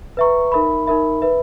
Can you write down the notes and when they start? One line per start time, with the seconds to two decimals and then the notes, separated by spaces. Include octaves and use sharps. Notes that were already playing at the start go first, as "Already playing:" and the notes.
0.17 B4 E5 A#5 C#6
0.52 D#4 A#4 E5 B5
0.87 D#4 A#4 E5 B5
1.22 B4 E5 B5